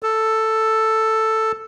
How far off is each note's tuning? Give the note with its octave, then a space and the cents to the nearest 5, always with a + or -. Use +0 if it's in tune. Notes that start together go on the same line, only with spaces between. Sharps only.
A4 +5